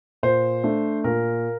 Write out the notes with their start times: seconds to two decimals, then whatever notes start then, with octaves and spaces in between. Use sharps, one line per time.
0.23 A#2 C5
0.64 A3 D4
1.04 A#2 A#4